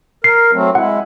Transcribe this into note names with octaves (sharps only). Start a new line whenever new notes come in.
A#4 C7
F#3 A3 C4
G#3 E4 F#5